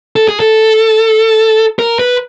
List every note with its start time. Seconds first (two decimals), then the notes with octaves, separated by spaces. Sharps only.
0.16 A4
0.28 G#4
0.40 A4
1.79 A#4
1.99 B4